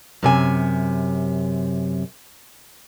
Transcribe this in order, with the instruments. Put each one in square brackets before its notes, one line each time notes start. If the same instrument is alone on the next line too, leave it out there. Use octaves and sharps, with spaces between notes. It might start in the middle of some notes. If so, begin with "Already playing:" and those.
[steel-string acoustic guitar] F#2 C3 G#5